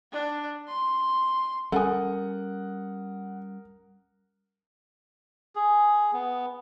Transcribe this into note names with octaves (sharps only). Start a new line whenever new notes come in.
D4
C6
G3 C#4 A4 A#4 F#5 G#5 D#6
G#4
B3